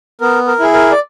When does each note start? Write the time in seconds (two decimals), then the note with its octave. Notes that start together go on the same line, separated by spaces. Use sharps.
0.21 B3 A#4
0.47 A#4
0.60 E4 G#4
0.74 A#4
0.91 D5